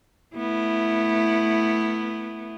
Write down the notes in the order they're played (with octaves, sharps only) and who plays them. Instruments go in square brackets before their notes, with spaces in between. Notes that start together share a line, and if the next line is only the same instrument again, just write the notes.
[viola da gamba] A3 B3 E4